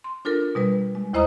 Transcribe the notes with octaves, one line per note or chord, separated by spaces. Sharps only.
C6
D4 F4 A4 A#4
B2 G3 B4
G#3
D#2 E4 C5 D#5 A#5 D#6